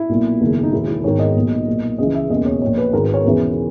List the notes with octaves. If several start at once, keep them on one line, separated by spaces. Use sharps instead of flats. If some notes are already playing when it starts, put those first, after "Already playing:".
Already playing: E4
B1 A#2
F#1 E2 D#3
D#4
E1 E2 D#3 E4
E4
G#1 G#2 D#3 C#5
D#5
B1 A#2
B1 A#2
C#2 C#3 E3 D#5
E5
E1 D#2 C#3 D#5
C#5
A#1 A#2 C#5
B4
G#1 G#2 D#3 A#4
B4
C#5
E1 E2 C#3 E3 B4